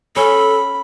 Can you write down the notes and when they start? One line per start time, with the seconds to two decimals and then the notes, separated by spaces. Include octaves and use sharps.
0.16 C#4 A4 B5